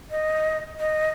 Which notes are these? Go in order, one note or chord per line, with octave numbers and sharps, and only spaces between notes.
D#5
D#5